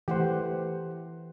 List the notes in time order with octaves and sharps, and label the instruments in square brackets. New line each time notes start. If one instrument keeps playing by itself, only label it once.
[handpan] E3 A3 F#5 [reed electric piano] G4 C5